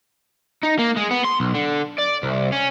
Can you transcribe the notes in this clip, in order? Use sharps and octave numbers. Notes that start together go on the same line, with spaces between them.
D#4
A#3
G#3
B3
C6
B1
D3
D5
C2
C#4